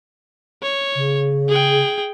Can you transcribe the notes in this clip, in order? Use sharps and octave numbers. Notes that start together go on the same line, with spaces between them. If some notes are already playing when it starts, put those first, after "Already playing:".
C#5
C#3
G#4 G5